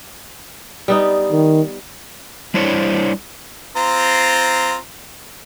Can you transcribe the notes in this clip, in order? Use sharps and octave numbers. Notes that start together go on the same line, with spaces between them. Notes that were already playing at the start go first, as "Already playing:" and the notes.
G3 B3 D#4
D#3
G3 D4 E4 C5 C#5
C4 F4 A#5